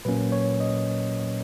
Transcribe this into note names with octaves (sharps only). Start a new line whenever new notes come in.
A#2 F#3 A#3 C#4 B4
C#5
D#5